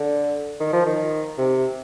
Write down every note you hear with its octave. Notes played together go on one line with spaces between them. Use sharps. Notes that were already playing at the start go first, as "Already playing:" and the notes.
Already playing: D3
D#3
F3
D#3
C3